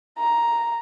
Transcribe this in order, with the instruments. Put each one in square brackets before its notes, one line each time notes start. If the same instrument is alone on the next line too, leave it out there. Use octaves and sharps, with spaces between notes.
[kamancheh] A#5